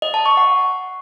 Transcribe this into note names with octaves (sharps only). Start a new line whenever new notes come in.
D#5
A5
C#6
F#5